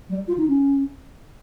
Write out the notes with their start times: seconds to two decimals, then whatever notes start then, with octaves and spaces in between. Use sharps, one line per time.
0.09 G3
0.28 F4
0.38 D#4
0.48 C#4